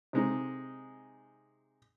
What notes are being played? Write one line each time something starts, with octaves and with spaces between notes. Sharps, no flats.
C3 G#3 D#4